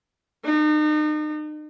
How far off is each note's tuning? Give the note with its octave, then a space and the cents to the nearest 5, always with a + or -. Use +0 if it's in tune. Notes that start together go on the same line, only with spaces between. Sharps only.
D#4 -40